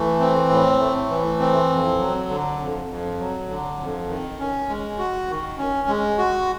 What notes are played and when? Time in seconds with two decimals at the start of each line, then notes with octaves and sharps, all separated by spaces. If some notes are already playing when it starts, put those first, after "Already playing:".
Already playing: E3 A3
0.20 C4
0.49 A2
0.79 A3
1.09 E3
1.40 C4
1.70 F2
1.99 F#3
2.29 D3
2.59 F2
2.89 F2
3.19 F#3
3.49 D3
3.79 F2
4.08 D#3
4.39 C#4
4.69 G#3
4.98 F#4
5.29 D#3
5.58 C#4
5.88 G#3
6.18 F#4